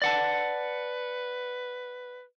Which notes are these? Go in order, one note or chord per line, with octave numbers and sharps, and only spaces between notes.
B4 D5 F#5 A5